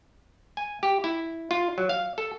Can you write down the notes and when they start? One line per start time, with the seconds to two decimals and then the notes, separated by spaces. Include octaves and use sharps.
0.57 G#5
0.83 G4
1.04 E4
1.51 F4
1.78 F#3
1.89 F5
2.18 A4